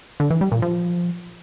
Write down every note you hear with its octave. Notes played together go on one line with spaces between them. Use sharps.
D3
E3
G3
A#2
F3